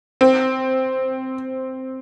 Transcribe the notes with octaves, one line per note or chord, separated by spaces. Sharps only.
C4